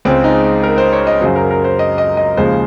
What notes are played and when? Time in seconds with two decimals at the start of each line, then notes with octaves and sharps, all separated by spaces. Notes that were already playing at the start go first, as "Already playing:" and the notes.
0.05 C#2 C#3 G#3 C4
0.24 D#4
0.63 A#4
0.78 C5
0.93 C#5
1.07 D#5
1.21 F#2 C#3 F#3 C5
1.36 A#4
1.51 A#4
1.64 C5
1.79 D#5
1.98 D#5
2.17 D#5
2.37 D#2 C#3 F3 G#3 C5